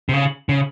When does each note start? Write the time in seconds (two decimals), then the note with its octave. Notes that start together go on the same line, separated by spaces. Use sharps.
0.09 C3
0.14 C#3
0.49 C#3